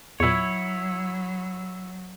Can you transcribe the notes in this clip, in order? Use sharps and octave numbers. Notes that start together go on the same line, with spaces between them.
E2 A#2 F#3 E4 C#5